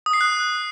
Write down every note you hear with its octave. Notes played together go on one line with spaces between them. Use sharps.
D#6
C7
F#6